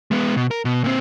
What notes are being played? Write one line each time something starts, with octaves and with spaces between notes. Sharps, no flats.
G#3 B3
B2
A#4
B2
A#2 C4